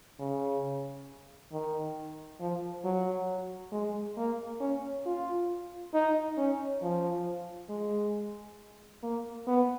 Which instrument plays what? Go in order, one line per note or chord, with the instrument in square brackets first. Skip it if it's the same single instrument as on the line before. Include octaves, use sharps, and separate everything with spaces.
[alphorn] C#3
D#3
F3
F#3
G#3
A#3
C#4
F4
D#4
C#4
F3
G#3
A#3
B3